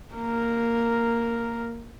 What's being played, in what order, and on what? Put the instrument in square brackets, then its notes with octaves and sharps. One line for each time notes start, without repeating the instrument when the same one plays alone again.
[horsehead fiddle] A#3 A#4